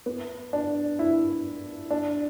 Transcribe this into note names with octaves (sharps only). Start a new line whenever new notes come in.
B3
D4
E4
D4